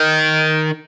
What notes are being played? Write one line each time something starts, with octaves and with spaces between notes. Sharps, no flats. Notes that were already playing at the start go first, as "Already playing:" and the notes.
Already playing: D#3